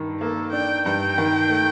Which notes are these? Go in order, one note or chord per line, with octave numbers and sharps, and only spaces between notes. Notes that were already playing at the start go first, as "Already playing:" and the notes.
Already playing: G2 D#3
A#3 A4
D4 G5
G2 G5
D#3
A3